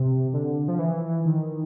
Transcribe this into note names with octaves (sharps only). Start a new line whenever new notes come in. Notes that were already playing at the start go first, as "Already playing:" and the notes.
Already playing: C3
D3
F3
E3
D#3